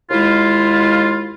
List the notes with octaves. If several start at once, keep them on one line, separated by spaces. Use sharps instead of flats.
D#2 G#3 E4 F4